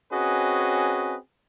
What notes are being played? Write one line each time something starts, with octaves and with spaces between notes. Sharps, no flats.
C4 C#4 F#4 G#4 B4 D#5